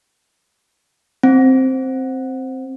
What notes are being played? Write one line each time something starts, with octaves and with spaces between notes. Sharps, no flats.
C4